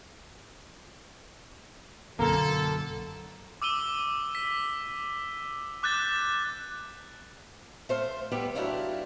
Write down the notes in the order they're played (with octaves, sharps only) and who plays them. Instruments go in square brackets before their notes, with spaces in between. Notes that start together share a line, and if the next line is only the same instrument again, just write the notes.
[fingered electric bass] B1 F#2 [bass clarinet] D3 [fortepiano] A#3 [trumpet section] A4
[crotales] D6 E6 D#7 G7
B6
D6 F#6 G6 A6 E7
[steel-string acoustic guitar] A3 C5 F5
G3 B3 G4 B4 E5
F#3 A3 D4 E4 F4 G4